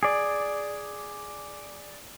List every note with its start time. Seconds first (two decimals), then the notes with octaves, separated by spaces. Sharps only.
0.03 G#4 D5